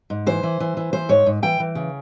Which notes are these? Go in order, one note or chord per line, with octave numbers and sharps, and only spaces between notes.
G#2
E3 C5
E3
E3
E3
E3 C5
G#2 C#5
G#2
E3 G5
E3
C#3